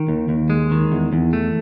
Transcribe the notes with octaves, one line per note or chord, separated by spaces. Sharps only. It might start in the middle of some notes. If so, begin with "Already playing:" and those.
Already playing: D#3
D#2
D#2
G#3
D#3
E2
E2
A3